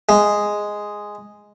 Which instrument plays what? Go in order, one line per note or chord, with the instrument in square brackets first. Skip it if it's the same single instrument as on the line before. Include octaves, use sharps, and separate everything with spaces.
[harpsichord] G#3